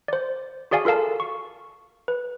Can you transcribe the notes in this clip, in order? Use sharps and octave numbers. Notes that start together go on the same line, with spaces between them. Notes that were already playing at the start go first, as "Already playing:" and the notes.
C5 D5
F#4 G#4 D5 F5 G#5
F4 A4 A#4 F5 A5
C#6
B4